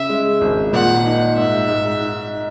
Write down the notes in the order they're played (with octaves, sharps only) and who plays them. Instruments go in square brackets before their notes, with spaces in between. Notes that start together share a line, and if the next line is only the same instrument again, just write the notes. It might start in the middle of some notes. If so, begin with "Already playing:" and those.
Already playing: [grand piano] C#3 [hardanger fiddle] E5
[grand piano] G#3
G#1
[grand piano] A#2 [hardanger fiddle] F#5
[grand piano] D#4
[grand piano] G#2 [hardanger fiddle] E5
[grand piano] G#2
D#4